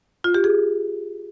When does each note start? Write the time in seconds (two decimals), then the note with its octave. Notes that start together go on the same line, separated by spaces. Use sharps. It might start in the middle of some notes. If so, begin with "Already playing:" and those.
0.24 F4
0.35 G4
0.44 G#4